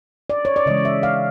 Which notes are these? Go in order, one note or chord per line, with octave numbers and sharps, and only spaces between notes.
D5
C#5
D5
C#3 E3 G#3 D#5
E5
F5